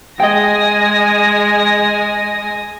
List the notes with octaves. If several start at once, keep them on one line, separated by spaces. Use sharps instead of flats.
G#3 D#5 G5 G#5 A#6